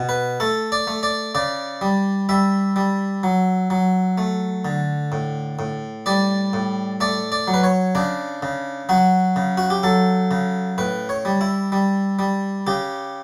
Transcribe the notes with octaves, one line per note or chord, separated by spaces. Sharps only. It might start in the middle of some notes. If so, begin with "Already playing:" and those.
Already playing: B2
B4
A3 A4
D5
A3
D5
C#3 D5
G3
G3 E5
G3
F#3
F#3
A3
D3
A2
A2
G3 D5
A2
A3 D5
D5
F#3
B4
C#5
C#3 D4
C#3
F#3 F#4
C#3
F#4
G4
F#3 A4
C#3
A2 B4
C#5
G3
E4
G3
G3
C#3 G4